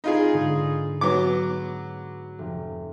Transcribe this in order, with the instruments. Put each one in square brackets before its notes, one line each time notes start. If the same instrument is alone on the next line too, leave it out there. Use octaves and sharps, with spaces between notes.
[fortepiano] D#4 F4 G#4 [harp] B5 G#6 D7
[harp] G#2 D3
[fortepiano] F#3 B3 D6
[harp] F1